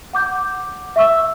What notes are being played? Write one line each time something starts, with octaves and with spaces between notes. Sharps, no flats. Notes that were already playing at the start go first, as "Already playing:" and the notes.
F#5 D6 G6
E5 C#6 E6